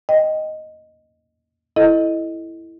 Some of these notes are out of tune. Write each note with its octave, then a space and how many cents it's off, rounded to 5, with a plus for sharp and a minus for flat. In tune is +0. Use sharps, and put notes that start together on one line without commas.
D#5 +0 G5 +0
E4 +0 A4 -5 D#5 +0